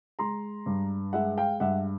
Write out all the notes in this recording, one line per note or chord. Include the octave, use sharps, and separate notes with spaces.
G#3 A#5 C6
G2
G#3 E5 F#5
F5 G5
G2 E5 F#5